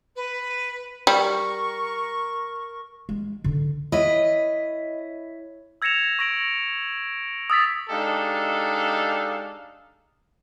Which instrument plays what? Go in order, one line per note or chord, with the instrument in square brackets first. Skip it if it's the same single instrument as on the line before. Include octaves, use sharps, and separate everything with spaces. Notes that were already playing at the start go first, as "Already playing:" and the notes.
[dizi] B4
[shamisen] G3 [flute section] A#4 C#6
[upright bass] G#3
D3 D#3
[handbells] E4 C#5 E5 [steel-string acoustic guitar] D#5
[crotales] E6 G#6 A#6 C#7 E7 F7
C#6 G#6 A#6 D7 F#7
D#6 E6 A6 B6
[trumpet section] G#3 D4 D#4 G4 A4 F5